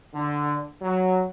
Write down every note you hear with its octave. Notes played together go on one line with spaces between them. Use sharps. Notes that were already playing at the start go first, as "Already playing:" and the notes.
D3
F#3